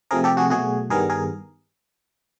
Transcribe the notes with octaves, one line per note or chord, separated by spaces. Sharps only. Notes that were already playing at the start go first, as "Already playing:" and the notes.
C3 F3 A3 C4 G#4 A#4
G4 A4
F#4 G#4
B2 F#3 A3 F#4 G#4
G2 D#3 G3 B3 G#4 A#4
G#4 A#4